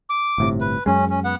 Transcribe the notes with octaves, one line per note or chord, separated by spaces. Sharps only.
D6
G1 A2 C3
B4
F#2 G#3 C#4
C#4
B3 F#5